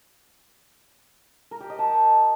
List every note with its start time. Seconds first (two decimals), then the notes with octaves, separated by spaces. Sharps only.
1.51 A#4
1.60 G4
1.70 D#5
1.79 A5